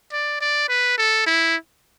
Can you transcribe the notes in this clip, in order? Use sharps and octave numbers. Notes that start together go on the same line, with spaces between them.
D5
D5
B4
A4
E4